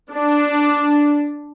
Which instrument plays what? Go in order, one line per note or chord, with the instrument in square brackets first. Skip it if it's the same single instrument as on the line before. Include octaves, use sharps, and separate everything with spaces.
[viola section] D4